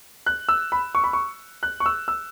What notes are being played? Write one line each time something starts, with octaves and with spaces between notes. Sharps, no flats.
F#6
E6
B5
C#6
B5
C#6
F#6
C#6
E6
E6